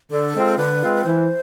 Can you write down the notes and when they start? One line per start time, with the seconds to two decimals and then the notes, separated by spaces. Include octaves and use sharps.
0.10 D3 A4
0.34 G#3 C4 F4
0.57 D3 B4
0.81 G#3 C4 F4
1.04 E3 C5